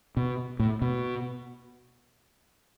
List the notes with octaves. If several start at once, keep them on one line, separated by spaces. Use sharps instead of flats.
B2
A2
B2